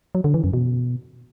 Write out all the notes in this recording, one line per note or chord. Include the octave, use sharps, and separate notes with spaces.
F#3
D3
E3
F#2
B2